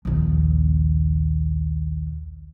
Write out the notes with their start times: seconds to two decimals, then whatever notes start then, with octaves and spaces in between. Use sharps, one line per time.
0.05 A#1 D#2